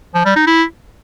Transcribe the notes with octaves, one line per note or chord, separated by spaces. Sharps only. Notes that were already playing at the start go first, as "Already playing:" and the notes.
F3
G3
D#4
E4